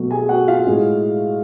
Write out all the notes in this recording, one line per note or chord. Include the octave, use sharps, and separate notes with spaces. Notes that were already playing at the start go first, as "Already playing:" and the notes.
Already playing: B2 F#3 A3 F#4
G#4 G#5
F#4 F#5
F4 F5
A2 G#3